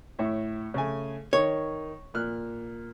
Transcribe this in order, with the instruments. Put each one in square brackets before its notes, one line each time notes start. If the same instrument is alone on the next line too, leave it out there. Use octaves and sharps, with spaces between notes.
[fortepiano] A2 C#5 E5
C#3 A3 G#5
[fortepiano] D#3 D#4 [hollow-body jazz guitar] C#5
[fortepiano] A#2 F6 F#6